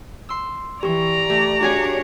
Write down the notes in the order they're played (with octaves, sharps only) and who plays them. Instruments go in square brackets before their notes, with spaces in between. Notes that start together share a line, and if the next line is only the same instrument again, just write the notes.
[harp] C6 E6
[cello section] E3 [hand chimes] G4 C#6 [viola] D5 A#5
[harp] A3 [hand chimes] G4
[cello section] D4 C#5 [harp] F#4 G#4 G#5